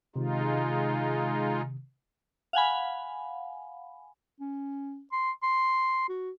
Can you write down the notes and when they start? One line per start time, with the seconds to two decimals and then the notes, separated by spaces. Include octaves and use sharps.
0.16 C3 D#3 G#3 D#4 F4
2.53 F5 F#5 G#5 B5
4.40 C#4
5.12 C6
5.42 C6
6.09 F#4